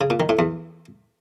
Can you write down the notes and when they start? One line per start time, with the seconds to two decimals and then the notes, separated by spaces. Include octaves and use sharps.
0.01 C#3
0.10 A#2
0.20 D#3
0.29 A2
0.39 E2